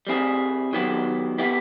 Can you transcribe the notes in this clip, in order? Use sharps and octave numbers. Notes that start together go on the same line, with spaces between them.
G3 C4 E4 G#4
D#3 F#3 B3 E4 G4
B3 E4 G4